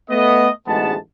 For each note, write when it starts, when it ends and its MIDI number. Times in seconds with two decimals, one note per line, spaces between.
0.10 0.49 57
0.10 0.49 59
0.10 0.49 75
0.67 0.95 33
0.67 0.95 38
0.67 0.95 44
0.67 0.95 56
0.67 0.95 59
0.67 0.95 81